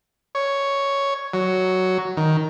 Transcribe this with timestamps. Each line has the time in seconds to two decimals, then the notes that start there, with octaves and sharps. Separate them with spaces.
0.35 C#5
1.34 F#3
2.17 D#3